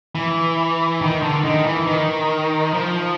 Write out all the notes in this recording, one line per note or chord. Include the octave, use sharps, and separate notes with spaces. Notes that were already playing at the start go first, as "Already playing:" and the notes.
E3
D#3
D3
D#3
E3
D#3
F3